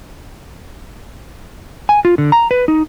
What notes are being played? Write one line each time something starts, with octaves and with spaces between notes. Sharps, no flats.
G#5
F4
D3
A#5
B4
D#4